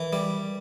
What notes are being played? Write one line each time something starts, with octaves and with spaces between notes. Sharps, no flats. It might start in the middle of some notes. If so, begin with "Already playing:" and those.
Already playing: E3 A#4
G3